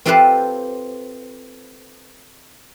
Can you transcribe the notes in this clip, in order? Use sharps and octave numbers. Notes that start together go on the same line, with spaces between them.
C4 F4 G4 A4 B4 C5